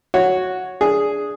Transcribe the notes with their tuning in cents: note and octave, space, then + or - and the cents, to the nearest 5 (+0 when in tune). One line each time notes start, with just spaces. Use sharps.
F#4 -5 C#5 +0
D4 -10 G#4 +0